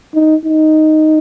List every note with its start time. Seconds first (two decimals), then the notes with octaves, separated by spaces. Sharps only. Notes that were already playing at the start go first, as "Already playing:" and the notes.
0.14 D#4
0.45 D#4